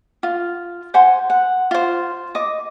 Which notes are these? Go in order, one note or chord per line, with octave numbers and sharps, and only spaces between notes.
F4
C5 F#5 G#5 C6
F#5
F4 C5
D#5 D6